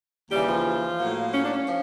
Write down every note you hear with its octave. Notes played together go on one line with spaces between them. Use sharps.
D#2 C#3 E3 G3 G4
F3 F4
A2 F#3 A#3
C#4
D4
C#4
F3